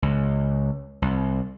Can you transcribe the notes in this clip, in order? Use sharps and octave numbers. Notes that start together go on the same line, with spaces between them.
C#2
C2